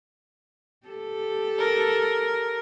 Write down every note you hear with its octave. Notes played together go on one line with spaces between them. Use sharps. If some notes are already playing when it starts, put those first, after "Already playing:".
G4 A4
A#4